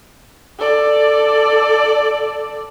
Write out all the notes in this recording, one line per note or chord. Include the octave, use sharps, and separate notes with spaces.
A4 D5